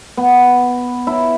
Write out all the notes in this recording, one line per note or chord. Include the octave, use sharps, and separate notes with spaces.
B3
E4